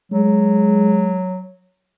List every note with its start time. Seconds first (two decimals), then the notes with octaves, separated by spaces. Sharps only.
0.12 F#3 G#3